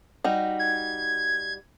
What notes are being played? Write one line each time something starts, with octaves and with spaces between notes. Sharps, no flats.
G3 D#4 F#4
G#6